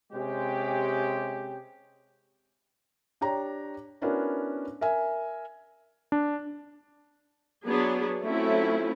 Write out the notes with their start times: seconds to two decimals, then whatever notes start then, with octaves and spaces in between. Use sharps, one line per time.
0.13 C3 G#3 C#4 G4
3.21 D4 G4 C#5 A#5
4.01 B3 C#4 D4 E4 F#4 A#4
4.81 A#4 E5 G#5
6.12 D4
7.66 F#3 B3 D4 G#4
8.24 F#3 A3 C4 C#4 E4 F4